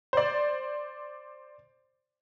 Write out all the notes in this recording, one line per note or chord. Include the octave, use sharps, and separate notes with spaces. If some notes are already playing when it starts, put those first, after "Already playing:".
C5 D5